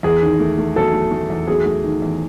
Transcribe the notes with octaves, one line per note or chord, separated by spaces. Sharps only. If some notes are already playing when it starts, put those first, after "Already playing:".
E2 G#4
D#3
A3
A3
F#3 A4
A3
A3
E2
F#3 G#4
A3
D#3
E2